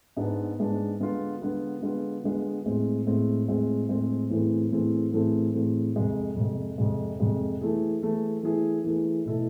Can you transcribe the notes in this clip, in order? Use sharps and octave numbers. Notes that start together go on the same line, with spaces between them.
G#2 G#3 B3 D4
G#2 G#3 B3 D4
D3 G#3 B3 F4
D3 G#3 B3 F4
D3 G#3 B3 F4
D3 G#3 B3 F4
A2 G#3 C4 G#4
A2 G#3 C4 G#4
A2 G#3 C4 G#4
A2 G#3 C4 G#4
A2 E3 A3 C4 G#4
A2 E3 A3 C4 G#4
A2 E3 A3 C4 G#4
A2 E3 A3 C4 G#4
F2 C3 G#3
F2 C3 G#3
F2 C3 G#3
F2 C3 G#3
E3 A3 E4 G#4
E3 A3 E4 G#4
E3 A3 E4 G#4
E3 A3 E4 G#4
B2 A3 E4 A4